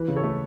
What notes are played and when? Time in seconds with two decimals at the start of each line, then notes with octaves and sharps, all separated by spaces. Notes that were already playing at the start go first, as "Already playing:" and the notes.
Already playing: E3 B4
0.08 C#3
0.16 A4 C#5
0.24 A3